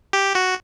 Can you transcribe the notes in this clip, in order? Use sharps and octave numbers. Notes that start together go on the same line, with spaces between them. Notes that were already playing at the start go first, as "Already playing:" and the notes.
G4
F#4